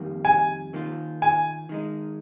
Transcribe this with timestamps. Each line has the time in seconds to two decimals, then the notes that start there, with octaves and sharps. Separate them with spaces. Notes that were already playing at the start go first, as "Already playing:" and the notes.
Already playing: F2 D#3 G3 A#3
0.25 G#5
0.74 D#3 A#3 F4
1.22 G#5
1.69 D#3 G#3 D#4